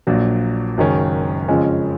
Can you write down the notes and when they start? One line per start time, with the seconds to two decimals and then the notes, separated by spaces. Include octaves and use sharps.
0.07 A#1 A#2 F#3
0.77 F#1 F#2 D#3 G#3 C#4
1.48 F2 C#3 F3 G#3 C#4